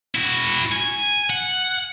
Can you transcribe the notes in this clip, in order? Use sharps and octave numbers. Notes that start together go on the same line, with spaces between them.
E4 F#4
G#5
F#5